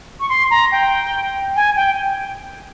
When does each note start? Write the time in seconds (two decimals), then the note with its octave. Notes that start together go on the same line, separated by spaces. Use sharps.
0.20 C#6
0.29 C6
0.51 A#5
0.72 G5
1.56 G#5
1.76 G5